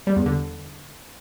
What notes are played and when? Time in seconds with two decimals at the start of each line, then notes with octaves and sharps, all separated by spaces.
0.07 G3
0.16 E2
0.26 D3